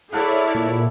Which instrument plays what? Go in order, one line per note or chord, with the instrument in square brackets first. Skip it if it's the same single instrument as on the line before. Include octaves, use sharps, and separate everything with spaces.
[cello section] E4 [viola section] G#4 C#5 D5 [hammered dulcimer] A4 F5 F#5
[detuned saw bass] A#2